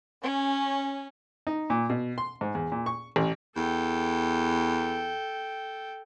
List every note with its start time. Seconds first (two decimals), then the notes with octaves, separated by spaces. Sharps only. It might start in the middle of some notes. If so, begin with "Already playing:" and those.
0.22 C#4
1.47 D#4
1.70 A#2
1.90 B2
2.18 C6
2.41 G#2
2.55 E2
2.72 A#2
2.86 C#6
3.16 A1
3.56 E2 A4 G5